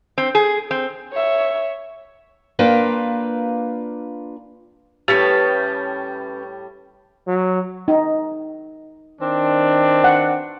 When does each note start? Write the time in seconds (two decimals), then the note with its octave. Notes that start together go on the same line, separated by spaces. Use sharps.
0.18 C4
0.35 G#4
0.71 C4
1.12 C#5 E5
2.59 A#3 D4 F4 B4 G5
5.08 A2 G3 C#4 G4 B4 A5 A6
7.27 F#3
7.88 D#4
9.21 D#3 C4 D4
10.04 F#5